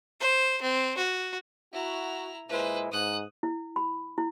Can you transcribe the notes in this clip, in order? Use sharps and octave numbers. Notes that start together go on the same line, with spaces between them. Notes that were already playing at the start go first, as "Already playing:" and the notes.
C5
C4
F#4
E4 F#4 A#5
A#2 G#3 E4 B4 C5
G#2 D#6 F#6
E4
B5
E4